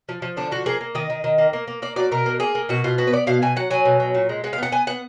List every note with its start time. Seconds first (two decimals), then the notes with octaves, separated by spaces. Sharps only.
0.09 F3
0.22 F3
0.37 D3 D4
0.51 F3 F#4
0.66 A#3 G#4
0.81 A#3
0.95 D#3 D#5
1.10 D#3
1.24 D#3
1.38 A#3
1.53 A#3
1.68 A#3
1.82 A#3 D5
1.96 F#3 D5
2.11 B2 A#4
2.26 A#3
2.40 A#3 G#4
2.55 A#3
2.69 B2 F#4
2.84 B2 F4
2.98 B3 F#4
3.07 B4
3.12 B3 D5
3.27 B2 F5
3.42 B2 G#5
3.56 F#3 F#5
3.70 F#3 G#5
3.85 B2
4.00 F#3
4.14 A#2
4.29 G#3
4.44 G#3 F#5
4.53 F5
4.58 B3 F#5
4.72 B3 G#5
4.87 B3 F#5